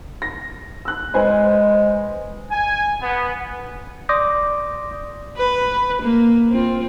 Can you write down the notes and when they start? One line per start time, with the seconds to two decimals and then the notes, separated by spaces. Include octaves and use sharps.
0.22 A#6
0.85 E6 F#6
1.14 G#3 B4 C5 G#5
2.51 G#5
3.02 B3
4.09 D5 C6 D6 D#6 G6 A#6
5.37 B4
6.03 A#3
6.50 C4 F4